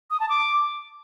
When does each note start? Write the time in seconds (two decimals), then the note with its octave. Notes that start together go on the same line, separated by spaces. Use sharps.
0.11 D#6
0.20 A5
0.29 D6